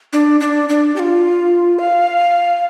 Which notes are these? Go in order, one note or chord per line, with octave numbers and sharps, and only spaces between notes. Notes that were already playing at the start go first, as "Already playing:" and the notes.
D4
D4
D4
G4
F4
F5